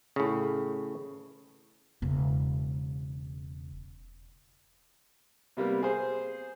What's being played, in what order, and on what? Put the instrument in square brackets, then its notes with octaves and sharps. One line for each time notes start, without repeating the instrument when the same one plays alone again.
[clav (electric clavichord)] A2 C#3
[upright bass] E1 C#3
[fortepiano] C3 G3 A#3 B3
G#4 C5